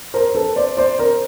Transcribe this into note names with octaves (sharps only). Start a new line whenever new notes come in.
A#4 C5
A4 B4
C5 D5
C5 D5
A#4 C5